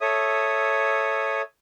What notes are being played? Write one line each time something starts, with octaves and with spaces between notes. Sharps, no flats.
A4 C#5 E5 D#6